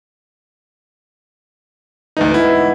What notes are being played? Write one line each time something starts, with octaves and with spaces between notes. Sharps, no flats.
D2 G#2 E3 D4 D#4
B3 E4